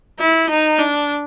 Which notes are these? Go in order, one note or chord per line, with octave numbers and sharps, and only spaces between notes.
E4
D#4
D4